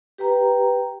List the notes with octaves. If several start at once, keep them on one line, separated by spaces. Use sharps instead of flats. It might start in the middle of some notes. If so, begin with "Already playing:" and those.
G4 B4 G5 A#5